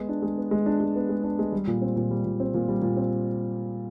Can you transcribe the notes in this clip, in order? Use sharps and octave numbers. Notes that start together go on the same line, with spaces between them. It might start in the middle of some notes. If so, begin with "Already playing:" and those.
Already playing: G#3 B3
D4
G#3
B3
G#3
D4
G#3
B3
G#3
D4
G#3
G3
A#2
C4
A#2
G3
A#2
C4
A#2
G3
A#2
C4